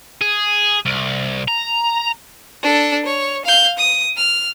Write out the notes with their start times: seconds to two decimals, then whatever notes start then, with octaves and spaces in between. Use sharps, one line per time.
0.21 G#4
0.85 C2
1.48 A#5
2.62 D4 A4
3.05 C#5
3.45 F5 G6
3.78 D#6
4.16 F6